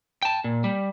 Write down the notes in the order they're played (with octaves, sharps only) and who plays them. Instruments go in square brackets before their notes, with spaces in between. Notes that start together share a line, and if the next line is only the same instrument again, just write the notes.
[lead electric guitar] G5 A5
A#2
G3